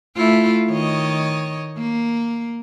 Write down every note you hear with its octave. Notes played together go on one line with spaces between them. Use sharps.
A3 E4 F4
D#3 C#5 D#5
A#3